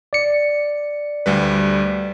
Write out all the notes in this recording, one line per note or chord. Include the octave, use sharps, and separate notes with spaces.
D5 C#7
D2 G3 B4